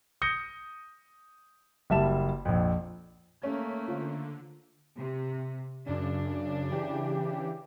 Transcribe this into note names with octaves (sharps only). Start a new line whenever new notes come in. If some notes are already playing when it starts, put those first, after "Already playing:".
D#6 G6 A#6 C#7 G7
F#1 G3 E5 A5 E7
A#1 F2
A3 A#3 C#4
D3 F4
C3
F#2 C#3 D4
C#3 E3 G4